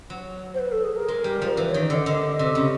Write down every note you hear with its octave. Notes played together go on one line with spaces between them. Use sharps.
F#3
C5
B4
A4
G#4
A#4
G#3
G3
F3
E3 B4
D#3 C#5
D5
D3 D#5
D3 D#5
C3
C#3